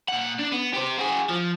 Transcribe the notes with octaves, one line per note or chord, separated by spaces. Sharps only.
A#2 F#5
D4
B3
G4 C5
F#4 G#4
F3